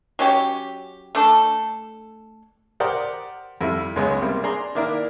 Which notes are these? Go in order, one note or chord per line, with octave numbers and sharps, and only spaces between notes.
F#3 C#4 G4
A3 D4 A4
G4 A#4 C5 D5 F#5 D#6
F2 G3 E4
C#2 F#2 C#3 G#3 B3 C#5
C3 G3 A#3 C4
D4 G#4 A#5 C6
D#3 A#3 D4 E4 A#4